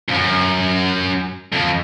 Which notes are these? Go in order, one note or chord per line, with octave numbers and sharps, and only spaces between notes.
F2
F#2
F2